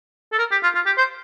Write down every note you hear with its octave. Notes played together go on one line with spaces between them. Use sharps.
A4
A#4
G4
F4
F4
G4
C5